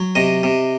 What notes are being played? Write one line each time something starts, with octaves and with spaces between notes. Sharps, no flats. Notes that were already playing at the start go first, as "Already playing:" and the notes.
Already playing: F#3
C3 D#5
C3